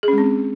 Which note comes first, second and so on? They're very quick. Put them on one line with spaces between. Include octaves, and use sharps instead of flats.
G#4 C#4 G#3 C4